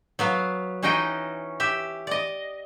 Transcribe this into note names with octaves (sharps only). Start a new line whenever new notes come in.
F#3 B3 F5
E3 C#4 D#4 F#4 D#5 G5
G4 E5
D5 D#5